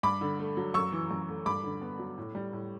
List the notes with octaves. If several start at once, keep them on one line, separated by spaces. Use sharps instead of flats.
G2 B5 D6
D3
A3
F#3
F#2 C#6 E6
E3
F#2
A3
G2 B5 D6
D3
B3
F#3
A2
G3
A2